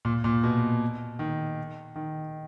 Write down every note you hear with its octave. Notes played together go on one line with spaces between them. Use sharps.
A#2
A#2
B2
D#3
D#3